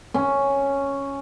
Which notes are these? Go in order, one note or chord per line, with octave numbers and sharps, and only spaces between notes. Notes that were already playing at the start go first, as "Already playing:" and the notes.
C#4